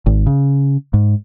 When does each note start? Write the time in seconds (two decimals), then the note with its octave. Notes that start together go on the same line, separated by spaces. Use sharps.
0.06 G#1
0.27 C#3
0.94 G#2